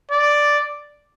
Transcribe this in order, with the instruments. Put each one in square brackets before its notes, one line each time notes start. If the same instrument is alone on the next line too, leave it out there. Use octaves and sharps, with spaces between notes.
[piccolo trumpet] D5